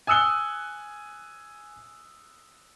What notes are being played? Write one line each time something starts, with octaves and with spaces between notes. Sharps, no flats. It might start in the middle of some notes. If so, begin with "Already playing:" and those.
G#5 D#6 E6 F#6 C#7 G7